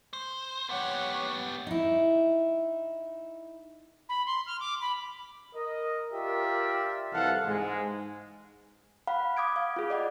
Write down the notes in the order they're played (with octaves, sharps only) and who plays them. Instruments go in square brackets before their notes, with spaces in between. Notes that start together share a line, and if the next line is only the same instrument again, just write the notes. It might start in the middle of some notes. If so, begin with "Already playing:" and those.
[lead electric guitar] C5
[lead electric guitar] B3 G4 [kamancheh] C#5 F#5
[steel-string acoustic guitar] D#4 E4
[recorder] B5
C6
F6
D6
B5
[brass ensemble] A#4 D#5
F4 G4 A#4 D5 E5
C2 E3 A4 F5 F#5
G#2 G#3
[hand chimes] F5 F#5 B5
D6 D#6 G#6 D7
F5
F4 G#4
D5 D#5 F#5